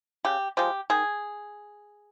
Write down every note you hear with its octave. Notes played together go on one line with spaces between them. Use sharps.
C#3 G4
F3 G#3 G4
D#3 G#4